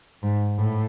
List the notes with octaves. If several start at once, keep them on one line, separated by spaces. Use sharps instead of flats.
G#2
A2